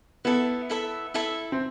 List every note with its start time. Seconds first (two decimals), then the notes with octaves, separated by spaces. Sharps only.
0.25 B3 E4 A4 E5
0.70 E4 A4 E5
1.14 E4 A4 E5
1.52 C4